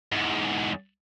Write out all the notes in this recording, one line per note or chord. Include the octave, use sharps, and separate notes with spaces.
E2 G#2